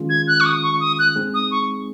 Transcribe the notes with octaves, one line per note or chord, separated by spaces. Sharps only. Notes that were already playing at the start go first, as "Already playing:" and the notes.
Already playing: D#3 G#3 C#4 F4 G#4
G#6
F#6
C#6
D#6
C#6
D#6
F#6
G#3 C4 D#4 G#4
D#6
C#6